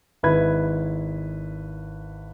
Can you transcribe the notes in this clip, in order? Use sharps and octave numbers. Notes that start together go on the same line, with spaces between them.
G#1 E4 B4 B5 G#6